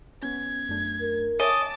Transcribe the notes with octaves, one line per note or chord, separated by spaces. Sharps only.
B3 C#4 G#6
F#2 A3 D4
A#4
C#5 D#5 E5 G#5 A5 D6